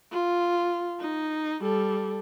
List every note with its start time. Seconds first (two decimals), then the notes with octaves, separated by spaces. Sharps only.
0.11 F4
1.00 D#4
1.62 G3 A4